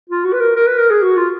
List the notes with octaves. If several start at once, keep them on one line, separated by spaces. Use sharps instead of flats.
F4
F#4
B4
A#4
A#4
B4
A#4
G#4
F#4
F4